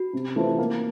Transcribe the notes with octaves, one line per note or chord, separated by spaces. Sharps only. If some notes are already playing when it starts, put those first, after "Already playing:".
Already playing: F#4
C3
E3 A3 C4 F4
A#3